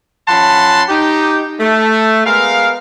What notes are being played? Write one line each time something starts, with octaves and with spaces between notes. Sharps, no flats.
F3 C#4 F#5 A5 B5 C6
D#4 G4
A3
G#3 B3 A#4 F5